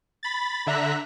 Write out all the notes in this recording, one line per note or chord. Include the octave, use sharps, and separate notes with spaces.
B5 A6
D3 E5 A#5 F#6 B6